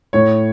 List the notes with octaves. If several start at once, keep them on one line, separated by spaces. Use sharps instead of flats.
A2 C#5